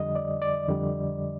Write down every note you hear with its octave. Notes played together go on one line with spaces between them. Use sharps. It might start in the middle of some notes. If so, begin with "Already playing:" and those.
Already playing: F2 D3 G3 D#5
D5
D5
F2 D3 G3